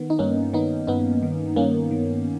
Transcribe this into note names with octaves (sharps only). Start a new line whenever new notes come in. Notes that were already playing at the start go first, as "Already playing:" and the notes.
Already playing: D#3 B3
D#4
G2 A#3 C#4
D#3 B3 D#4
G2 B3 D#4
D#3
G2 A#3 C#4
D#3